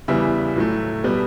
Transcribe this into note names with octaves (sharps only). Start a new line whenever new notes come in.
E2 C#3 E3 G3 B3 E5
A2 F#3 A3
B2 G3 B3